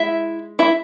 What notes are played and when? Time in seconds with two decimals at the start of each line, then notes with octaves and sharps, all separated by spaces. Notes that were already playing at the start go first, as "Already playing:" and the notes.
Already playing: G#3 E4 E5
0.59 E4 E5